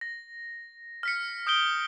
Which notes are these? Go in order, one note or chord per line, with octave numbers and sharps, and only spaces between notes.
A#6
F6 B6 C#7
D#6 G6 D7 G7